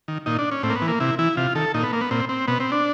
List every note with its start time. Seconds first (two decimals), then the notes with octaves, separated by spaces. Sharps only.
0.08 D#3
0.26 A#2 D#4
0.39 D4
0.51 C#4
0.63 A2 C4
0.70 A#3
0.76 B3
0.82 E3
0.88 A#3
1.00 C3 E4
1.19 E3 E4
1.37 C3 F4
1.55 D#3 A4
1.74 A#2 D#4
1.83 B3
1.93 A#3
2.01 B3
2.11 A#2 C4
2.29 C4
2.48 B2 B3
2.60 C4
2.72 D4